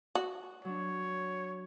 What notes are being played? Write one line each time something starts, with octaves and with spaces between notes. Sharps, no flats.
F#4
F#3 D4 C#5